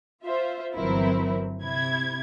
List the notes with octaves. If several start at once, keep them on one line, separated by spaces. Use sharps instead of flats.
F4 C5 E5
G1 E3 F#3 C4 E4 A#4
C3 E4 G#6